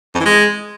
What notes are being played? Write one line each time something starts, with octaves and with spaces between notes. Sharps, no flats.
F2
E3
G#3